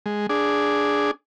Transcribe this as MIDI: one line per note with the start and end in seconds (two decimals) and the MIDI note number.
0.06 0.27 56
0.30 1.11 62
0.30 1.11 68